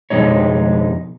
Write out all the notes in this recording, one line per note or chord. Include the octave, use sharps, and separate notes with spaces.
F2 B2 E3 G#3 D#4 C#5